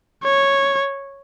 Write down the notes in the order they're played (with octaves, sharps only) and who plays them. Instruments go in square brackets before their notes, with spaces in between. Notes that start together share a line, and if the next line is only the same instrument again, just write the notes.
[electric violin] C#5